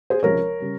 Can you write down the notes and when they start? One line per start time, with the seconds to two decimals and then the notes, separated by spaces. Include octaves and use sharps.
0.10 G#4 C5
0.23 C#2 C3 F3 G#3 A#4 C#5
0.60 C#3 G3